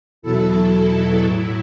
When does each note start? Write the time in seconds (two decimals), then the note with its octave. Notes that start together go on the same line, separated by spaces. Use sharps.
0.22 E2 B2 F#3 E4 A4
1.23 A2 F#3 E4